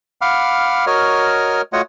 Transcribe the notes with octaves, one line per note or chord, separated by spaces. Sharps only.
F5 F#5 B5 D6 F6
F#4 A#4 C#5 D#5 F6
A3 F4 F#4 C#5 D#5 F#5